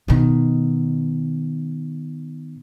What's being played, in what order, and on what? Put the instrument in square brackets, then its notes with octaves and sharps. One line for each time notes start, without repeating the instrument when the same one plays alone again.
[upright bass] B2 D#3